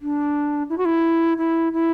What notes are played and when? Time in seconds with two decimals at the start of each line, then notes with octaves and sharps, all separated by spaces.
0.02 D4
0.70 E4
0.78 F#4
0.85 E4
1.38 E4
1.73 E4